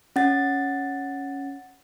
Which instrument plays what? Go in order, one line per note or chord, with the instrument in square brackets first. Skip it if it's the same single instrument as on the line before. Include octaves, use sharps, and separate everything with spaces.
[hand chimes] C#4 F#5 A6